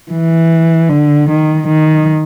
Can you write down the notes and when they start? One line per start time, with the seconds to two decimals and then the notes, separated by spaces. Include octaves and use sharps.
0.11 E3
0.89 D3
1.29 D#3
1.68 D#3